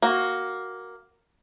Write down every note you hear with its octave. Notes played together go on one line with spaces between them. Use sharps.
A#3 F#4